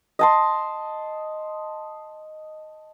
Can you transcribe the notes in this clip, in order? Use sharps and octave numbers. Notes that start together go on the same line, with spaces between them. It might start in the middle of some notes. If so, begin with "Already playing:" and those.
D#5 A5 C6